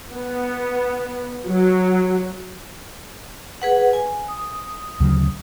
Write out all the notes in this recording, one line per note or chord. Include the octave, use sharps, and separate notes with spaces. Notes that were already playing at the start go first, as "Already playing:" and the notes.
B3
F#3
G#4 B4 F#5
G#5
D#6
D2 C#3 F#3